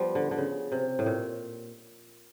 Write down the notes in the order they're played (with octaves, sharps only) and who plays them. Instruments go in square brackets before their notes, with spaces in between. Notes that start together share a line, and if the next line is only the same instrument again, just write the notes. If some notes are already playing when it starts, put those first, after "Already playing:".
Already playing: [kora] F3 G3 B3
D3
D3
C#3
C3
A2
A#2